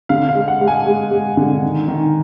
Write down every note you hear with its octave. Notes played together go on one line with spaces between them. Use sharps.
D3 F5
F5
G#3
F#5
G#3
G#5
G#3
G#3
D3
D#3
D#3